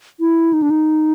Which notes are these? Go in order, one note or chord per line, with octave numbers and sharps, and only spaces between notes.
E4
D#4
D4
D#4